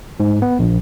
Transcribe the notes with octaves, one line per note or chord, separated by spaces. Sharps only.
G#2
B3
A#1